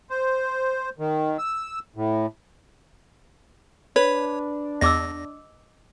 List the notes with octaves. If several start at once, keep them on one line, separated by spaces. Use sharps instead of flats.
C5
D#3
E6
A2
D4 B4 C#5
E2 D#5 D6 E6 A#6